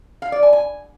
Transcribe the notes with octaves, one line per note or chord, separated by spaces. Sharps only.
F5
D5
G#5
G#5